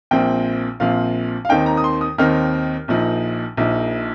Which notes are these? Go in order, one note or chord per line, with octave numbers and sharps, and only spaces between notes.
A#1 A#2 F3 C4 G5
A#1 A#2 F3 C4 F5
F5
D#2 D#3 C4 D#4 G5
A#5
D#6
C6
D#6
D#2 D#3 C4 D#4 F6
A#1 A#2 F3 D#4
A#1 A#2 F3 D#4